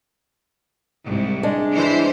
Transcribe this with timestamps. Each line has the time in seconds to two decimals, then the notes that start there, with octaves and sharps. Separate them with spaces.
1.04 C2 G#2
1.43 G#3 D4
1.74 E3 C5